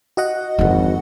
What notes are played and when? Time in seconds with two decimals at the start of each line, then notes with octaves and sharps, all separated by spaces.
0.17 F#4 D#5 F#5
0.59 G#1 F2 D3